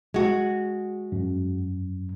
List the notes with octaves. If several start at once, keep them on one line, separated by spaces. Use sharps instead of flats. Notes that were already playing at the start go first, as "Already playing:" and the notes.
G#3 F#4
F#2